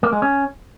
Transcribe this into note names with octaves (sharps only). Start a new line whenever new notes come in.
A#3
G#3
C#4